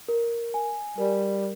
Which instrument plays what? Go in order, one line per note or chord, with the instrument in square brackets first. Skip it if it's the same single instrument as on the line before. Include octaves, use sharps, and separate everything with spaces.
[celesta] A#4
G#5
[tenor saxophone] G3 [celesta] A#4